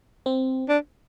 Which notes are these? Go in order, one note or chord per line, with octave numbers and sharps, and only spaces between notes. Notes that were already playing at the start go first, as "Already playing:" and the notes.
C4
D4